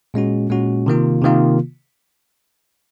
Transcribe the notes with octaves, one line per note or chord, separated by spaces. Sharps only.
A#2 G#3 C#4 F#4
A#2 G#3 C#4 F#4
C3 D#3 A#3 F4
C3 D#3 A#3 F4